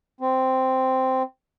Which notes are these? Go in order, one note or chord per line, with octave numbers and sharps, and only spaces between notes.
C4